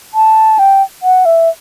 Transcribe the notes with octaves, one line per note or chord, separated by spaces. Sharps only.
A5
G5
F#5
E5